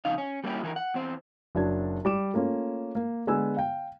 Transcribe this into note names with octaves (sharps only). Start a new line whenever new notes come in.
F2 C#3 D#4 F5
C#4
G3 A#3 C#4 E4 G4
E3 E4 A4 A#4
F#5
E2 C4 C5
F#1 F#3 D4 A5 G#6
G3 D6 E7
A3 A#3 C#4 F4
A#3
D3 G#3 B3 G#5 E6
F5 G5